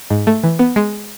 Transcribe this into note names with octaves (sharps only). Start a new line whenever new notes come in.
G#2
A3
E3
B3
G#3